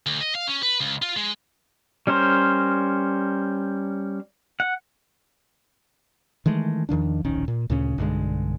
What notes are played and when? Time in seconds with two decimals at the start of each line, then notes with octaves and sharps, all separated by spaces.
0.06 D2
0.21 D#5
0.35 F5
0.48 C#4
0.63 B4
0.81 C#2
1.02 F4
1.17 G#3
2.07 G3 C#4 A#4 C5
4.60 F#5
6.46 D#3 E3 G#3 A3
6.89 E2 D#3 F3 D4
7.24 D1 A#1 D#3 C#4
7.48 A#2
7.70 D2 A#2 C#3 C#4
7.98 B1 G2 D3 G#3